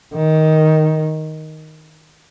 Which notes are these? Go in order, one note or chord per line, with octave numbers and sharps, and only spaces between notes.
D#3